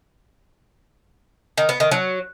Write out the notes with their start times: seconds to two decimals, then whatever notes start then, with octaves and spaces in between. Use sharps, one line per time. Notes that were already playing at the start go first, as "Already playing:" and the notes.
1.58 D#3
1.69 B3
1.80 D#3
1.91 F#3